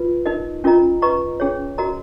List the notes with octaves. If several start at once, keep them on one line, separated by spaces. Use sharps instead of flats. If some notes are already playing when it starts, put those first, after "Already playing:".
Already playing: F4 B4
D#4 A#4 D#5
C#4 F4 A#4 D#5 A#5
B4 D#5 A#5 C#6
C#4 G#4 C#5
F#4 A#4 D#5 A#5